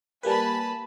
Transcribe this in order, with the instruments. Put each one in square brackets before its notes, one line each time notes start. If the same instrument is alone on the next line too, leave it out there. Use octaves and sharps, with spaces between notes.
[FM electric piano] G3 A#3 B4 [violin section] G#5 A5 B5